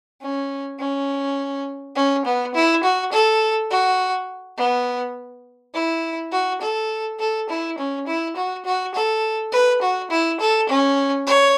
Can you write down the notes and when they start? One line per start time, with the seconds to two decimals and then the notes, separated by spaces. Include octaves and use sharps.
0.21 C#4
0.79 C#4
1.96 C#4
2.25 B3
2.54 E4
2.83 F#4
3.12 A4
3.71 F#4
4.57 B3
5.74 E4
6.32 F#4
6.61 A4
7.19 A4
7.49 E4
7.78 C#4
8.07 E4
8.36 F#4
8.65 F#4
8.94 A4
9.52 B4
9.82 F#4
10.11 E4
10.40 A4
10.69 C#4
11.27 C#5